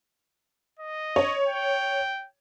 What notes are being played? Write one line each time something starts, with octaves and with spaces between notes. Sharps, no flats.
D#5
C#5
G5